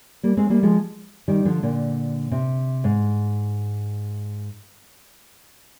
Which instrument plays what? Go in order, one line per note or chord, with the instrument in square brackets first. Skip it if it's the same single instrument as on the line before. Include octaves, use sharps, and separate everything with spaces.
[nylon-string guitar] G3 A#3
G#3 C4
G3 A#3
F3 G#3
D#3 G3
D3 F3
A#2 D3
C3
G#2